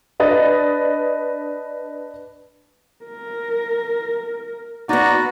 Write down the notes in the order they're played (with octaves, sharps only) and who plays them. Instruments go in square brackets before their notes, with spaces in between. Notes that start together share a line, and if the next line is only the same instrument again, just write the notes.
[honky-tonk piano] D4 B4 D#5 A6
[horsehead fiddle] A#4
[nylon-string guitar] B3 D#4 [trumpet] F#4 [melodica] D5 A#5